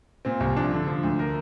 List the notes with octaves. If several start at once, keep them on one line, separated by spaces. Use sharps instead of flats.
A#2 C4
C2
F3 D4
D3
F3
D2
A#4